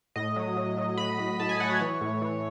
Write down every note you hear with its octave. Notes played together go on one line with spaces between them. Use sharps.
A2 D#5
F#3
F#3
F#3
F#3 B5
A2
A2 A5
G#5
F#3 F#5
C#5
E3
A2
E3